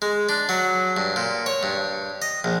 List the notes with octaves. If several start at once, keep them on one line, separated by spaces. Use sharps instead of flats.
G#3
D4
F#3
G2
A#2
C#5
G2
D#5
A#1